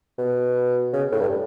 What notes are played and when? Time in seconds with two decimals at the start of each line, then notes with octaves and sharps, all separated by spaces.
0.18 B2
0.93 C#3
1.12 A2
1.21 G2